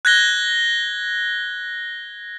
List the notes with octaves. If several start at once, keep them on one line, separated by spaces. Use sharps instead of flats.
F#6 G#6 A#6 G7